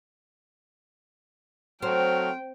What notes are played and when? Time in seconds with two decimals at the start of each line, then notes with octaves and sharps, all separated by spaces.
1.82 F#3 A3 C4 G5 F6